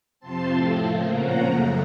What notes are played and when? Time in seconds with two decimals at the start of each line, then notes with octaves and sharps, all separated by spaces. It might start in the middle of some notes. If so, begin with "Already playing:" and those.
0.20 F2 C3 F3 C4 A5 C6
0.51 A2 F3 A3 C4
0.80 C#3 F3 A#3
1.11 A#2 F3 A#3 C#4 F#5 A#5
1.41 F#2 C#3 A3